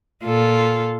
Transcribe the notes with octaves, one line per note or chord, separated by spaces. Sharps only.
A#2 F4 A4